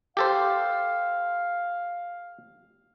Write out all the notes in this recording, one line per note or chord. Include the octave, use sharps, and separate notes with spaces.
G4 A4 C5 F5